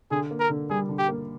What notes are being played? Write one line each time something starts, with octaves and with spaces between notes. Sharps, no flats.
D3 G#4
A#3
A#4
D3
G3 G#4
D3
G4
A#3